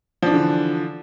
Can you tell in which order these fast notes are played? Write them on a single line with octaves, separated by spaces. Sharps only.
F3 D4 E3 D3